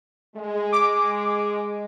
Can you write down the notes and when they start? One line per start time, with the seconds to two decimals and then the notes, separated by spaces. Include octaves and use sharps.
0.36 G#3
0.73 D6